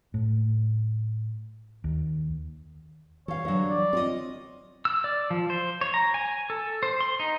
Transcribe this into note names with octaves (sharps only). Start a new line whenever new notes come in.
A2
D#2
E3 A4 C#5 F5
D3 E3 F#3 G3
D5
C4 F4 C#5 D#5
E6
D5
F3
C5
C#5
A#5
G#5
A4
C5
C6
D#4